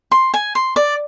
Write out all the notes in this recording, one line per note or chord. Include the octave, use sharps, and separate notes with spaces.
C6
G#5
C6
D5